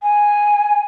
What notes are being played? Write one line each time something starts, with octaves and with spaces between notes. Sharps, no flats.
G#5